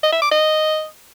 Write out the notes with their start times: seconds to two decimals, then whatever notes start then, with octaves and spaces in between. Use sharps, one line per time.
0.03 D#5
0.12 E5
0.22 D6
0.31 D#5